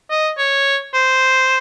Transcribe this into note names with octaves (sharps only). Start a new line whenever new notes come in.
D#5
C#5
C5